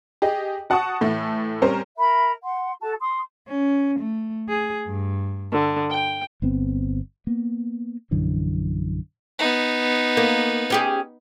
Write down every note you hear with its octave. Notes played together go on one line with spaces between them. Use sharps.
G4 G#4 D#5
F#4 F#5 A5 C#6 D#6
A2 E3 A3
G3 C4 C#4 A#4 C5
A#4 E5 B5
F#5 C6
F#4 A4 A5
C6 D#6
C#4
A3
G#4
G2
D3
G5
G1 B3 C4
A#3 B3
A#1 F#2 D3 E3
B3 D#4
A#3
C#4 G4 G#4